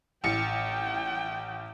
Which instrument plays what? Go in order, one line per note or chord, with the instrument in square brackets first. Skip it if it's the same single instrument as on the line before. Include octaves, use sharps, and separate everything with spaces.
[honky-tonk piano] A1 C#7 [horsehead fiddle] G5